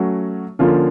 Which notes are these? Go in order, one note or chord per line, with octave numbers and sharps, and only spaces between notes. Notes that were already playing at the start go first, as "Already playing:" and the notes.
Already playing: F#3 A3 C#4 F#4
D3 F3 A#3 C#4 F4